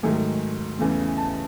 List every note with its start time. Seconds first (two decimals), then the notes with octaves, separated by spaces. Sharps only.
0.03 G#2 D#3 F#3 A3 G#5
0.79 E2 C#3 E3 A3
1.18 A5